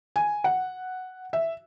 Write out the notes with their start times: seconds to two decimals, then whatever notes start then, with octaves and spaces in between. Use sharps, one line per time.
0.16 G#5
0.44 F#5
1.33 E5